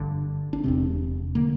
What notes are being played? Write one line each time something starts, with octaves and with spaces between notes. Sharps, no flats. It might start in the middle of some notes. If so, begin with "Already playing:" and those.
Already playing: G1 G2 D3
D4
E1 E2 C3 C4
D3 A#3